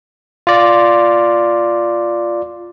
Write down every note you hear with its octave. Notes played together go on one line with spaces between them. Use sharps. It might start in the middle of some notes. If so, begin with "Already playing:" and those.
F4 D5